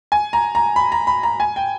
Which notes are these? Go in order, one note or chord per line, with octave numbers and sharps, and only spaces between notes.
G#5
A#5
A#5
B5
A#5
B5
A#5
G#5
G5